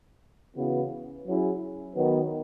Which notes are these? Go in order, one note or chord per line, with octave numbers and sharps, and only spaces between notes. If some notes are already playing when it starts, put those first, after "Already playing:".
C#3 E3 B3 F#4
F#3 C#4 E4 G#4
D#3 F#3 B3